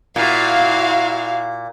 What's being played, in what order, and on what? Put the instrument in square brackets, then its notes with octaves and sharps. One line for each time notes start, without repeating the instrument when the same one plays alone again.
[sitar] A#2 [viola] E4 F#4 [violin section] F5